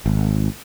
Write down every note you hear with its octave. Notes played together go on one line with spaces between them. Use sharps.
G#1